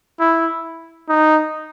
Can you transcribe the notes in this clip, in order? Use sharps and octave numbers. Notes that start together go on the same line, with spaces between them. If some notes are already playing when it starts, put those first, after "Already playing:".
E4
D#4